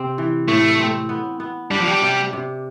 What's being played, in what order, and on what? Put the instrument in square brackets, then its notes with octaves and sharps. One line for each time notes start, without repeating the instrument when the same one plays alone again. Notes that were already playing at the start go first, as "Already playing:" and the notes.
Already playing: [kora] C3 C4
E3
[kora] A2 [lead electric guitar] A3
[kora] C4
B3
B3
[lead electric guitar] G3 [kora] D4
[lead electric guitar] F3
G3
[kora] C3
C3